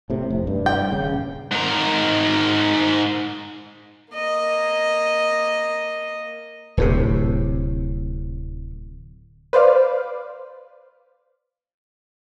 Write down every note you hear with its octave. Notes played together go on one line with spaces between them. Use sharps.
A2 C3
F1
G2
G5
D#1 C#3
G#2 A#4
A#3 D#5
D1 A2 C3
B4 C5 D5 F5